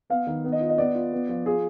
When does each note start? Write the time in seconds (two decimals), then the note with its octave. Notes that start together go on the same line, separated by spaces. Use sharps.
0.10 B3 F5
0.27 D#3
0.44 B3
0.52 D#5
0.61 F4
0.69 D#5
0.78 B3 D5
0.95 F4
1.12 B3
1.29 F3
1.46 F4 G#4